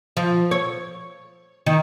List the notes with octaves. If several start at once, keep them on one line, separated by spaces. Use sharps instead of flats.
F3
C#5
D#3